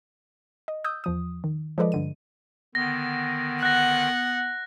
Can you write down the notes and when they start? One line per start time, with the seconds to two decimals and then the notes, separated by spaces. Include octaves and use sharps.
0.68 D#5
0.84 D#6 E6 G6
1.04 E2 F3 D#6
1.44 D#3
1.78 F3 G#3 A4 B4 D5 D#5
1.92 G2 D3 D#7
2.75 D3 D#3 B3 A#6
3.63 F#5 F#6 A#6